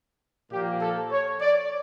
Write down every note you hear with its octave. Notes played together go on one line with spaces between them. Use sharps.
A#2 F3 A#3 G4
A4
C#5
D5